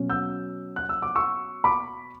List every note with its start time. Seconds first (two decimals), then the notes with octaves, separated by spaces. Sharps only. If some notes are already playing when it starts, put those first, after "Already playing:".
Already playing: B2 F#3 C#4
0.10 E6 G6
0.76 F#6
0.89 E6
1.02 D6
1.15 C#6 E6
1.64 B5 D6